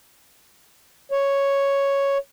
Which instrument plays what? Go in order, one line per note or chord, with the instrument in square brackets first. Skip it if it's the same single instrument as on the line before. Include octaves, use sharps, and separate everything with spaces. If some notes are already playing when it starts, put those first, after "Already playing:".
[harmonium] C#5